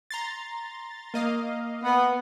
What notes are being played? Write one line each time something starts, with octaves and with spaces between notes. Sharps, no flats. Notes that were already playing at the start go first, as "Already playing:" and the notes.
A#5 C6 A6
A#3 D#5 F5
B3